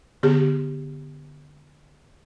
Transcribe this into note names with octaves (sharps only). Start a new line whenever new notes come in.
D3 B3 G4 G#4